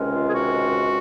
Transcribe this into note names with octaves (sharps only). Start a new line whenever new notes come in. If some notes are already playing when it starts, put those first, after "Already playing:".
Already playing: C#2 C3 D#3 G#3 C#4
F4
G#4
F#4